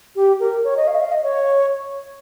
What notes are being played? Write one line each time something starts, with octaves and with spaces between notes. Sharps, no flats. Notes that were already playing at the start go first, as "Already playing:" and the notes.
G4
A#4
C#5
D#5
F5
D#5
F5
D#5
C#5